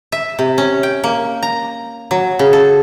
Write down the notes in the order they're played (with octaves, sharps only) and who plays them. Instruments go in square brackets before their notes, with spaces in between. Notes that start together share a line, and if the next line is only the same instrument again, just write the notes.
[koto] E5
C3
C#4
G5
A#3
A#5
F#3
C#3
A4